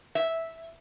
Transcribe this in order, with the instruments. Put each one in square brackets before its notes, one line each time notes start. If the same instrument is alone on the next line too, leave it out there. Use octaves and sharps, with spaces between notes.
[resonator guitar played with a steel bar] E5